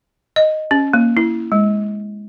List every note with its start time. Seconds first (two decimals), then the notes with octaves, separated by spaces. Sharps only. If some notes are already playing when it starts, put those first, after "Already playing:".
0.36 D#5
0.71 C#4
0.93 A#3
1.17 E4
1.52 G#3